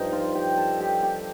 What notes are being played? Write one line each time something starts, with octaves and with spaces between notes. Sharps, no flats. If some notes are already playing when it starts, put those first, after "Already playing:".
Already playing: G2 F3 D#4
F4
G4
A4
G4
G4